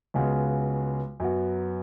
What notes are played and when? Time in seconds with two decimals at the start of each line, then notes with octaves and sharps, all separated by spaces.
0.14 C#2 C#3 G#3 B3 F#4
1.20 F#2 F#3 B3 F#4